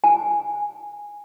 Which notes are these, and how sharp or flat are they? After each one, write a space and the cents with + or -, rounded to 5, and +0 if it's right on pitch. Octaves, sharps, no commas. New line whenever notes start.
G#5 -10